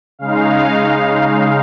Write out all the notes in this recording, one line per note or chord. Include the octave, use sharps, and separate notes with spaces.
C#3 G#3 D#4 F5